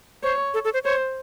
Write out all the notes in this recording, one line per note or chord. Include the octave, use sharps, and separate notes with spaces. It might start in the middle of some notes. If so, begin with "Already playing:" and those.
C5 C#5
A4
A4
C5
C5 C#5